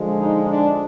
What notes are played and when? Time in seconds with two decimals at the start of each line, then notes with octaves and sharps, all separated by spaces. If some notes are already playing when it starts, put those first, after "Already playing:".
Already playing: D3 F3 G#3
0.18 D#4
0.48 D4